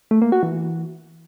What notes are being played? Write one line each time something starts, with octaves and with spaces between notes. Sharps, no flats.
A3
A#3
F#4
E3